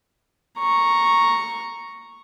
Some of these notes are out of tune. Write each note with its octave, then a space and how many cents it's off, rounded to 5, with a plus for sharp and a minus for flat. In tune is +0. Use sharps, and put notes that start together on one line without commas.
A#5 +0 C#6 -5